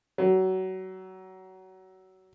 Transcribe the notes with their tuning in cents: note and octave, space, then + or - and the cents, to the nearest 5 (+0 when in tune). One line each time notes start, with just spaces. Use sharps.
F#3 +25